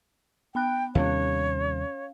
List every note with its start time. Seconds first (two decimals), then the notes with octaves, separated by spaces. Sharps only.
0.55 B3 G5 B5 F#6
0.95 D#2 C3 G3 C#4 C#5 F5